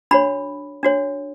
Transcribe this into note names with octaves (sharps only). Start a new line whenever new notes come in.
D4 F#4 C#5 B5
D4 F#4 C#5